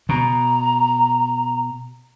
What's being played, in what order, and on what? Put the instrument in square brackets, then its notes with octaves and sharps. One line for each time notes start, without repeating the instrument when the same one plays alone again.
[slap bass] B2 [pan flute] A#5